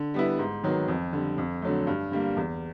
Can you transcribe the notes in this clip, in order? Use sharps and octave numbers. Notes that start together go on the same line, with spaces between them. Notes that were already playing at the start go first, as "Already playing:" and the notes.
Already playing: D3
G3 B3 E4
G#2
D#3 F#3 B3
F2
D3 G3
F2
D3 F#3 A3
G2
D3 G3 A#3
E2